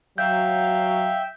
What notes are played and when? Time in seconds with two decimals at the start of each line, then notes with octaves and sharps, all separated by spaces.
0.18 F#3 E5 F5 G5 G6